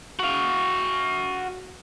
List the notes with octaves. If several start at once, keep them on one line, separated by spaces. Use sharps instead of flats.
F#4 F5